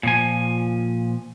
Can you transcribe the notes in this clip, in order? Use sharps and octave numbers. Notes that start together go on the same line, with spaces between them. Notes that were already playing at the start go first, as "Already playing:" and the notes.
A#2 F3 G#5